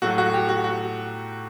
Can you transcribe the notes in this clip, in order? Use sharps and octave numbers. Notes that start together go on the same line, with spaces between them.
A2 F#3 A3 F#4
F#4
G4
F#4
F#4